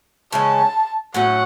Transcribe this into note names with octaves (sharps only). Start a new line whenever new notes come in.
C#3 E3 G#3 C#4 A5
A2 F#3 C#4 F#5